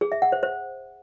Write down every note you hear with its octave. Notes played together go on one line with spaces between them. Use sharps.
G#4
E5
F#5
C5
C5